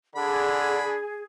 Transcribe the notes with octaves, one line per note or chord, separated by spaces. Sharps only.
D3 D4 G#4 B5